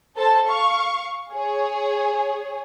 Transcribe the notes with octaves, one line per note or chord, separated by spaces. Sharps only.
A4 C5 A5
F5 C#6
G#4 C#5